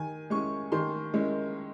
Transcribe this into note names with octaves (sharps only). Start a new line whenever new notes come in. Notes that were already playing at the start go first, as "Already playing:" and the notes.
Already playing: D#3 G#5
G#3 C#4 E4 C#6
D#3 C6
G#3 C#4 E4